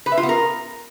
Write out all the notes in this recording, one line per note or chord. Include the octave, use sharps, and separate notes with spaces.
B4
E5
F4
B3
A#4